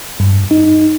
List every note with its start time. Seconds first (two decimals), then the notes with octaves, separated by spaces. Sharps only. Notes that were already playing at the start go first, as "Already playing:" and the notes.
0.20 G2
0.51 D#4